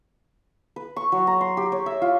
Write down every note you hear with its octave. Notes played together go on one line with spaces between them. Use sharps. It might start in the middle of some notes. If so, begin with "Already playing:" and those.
B4
C#6
F#3
A#5
C6
G4
C#5
E5
F4